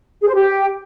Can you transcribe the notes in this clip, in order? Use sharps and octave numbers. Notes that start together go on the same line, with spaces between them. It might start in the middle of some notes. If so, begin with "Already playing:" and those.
G#4
C5
G4